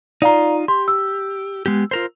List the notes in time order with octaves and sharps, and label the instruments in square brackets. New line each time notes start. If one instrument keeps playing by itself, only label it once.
[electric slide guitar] D#4 F4 [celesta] D5 F5 A#5
[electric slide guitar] G4 [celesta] C6
[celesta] E6
[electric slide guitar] G#3 B3 G4
F4 A#4 C5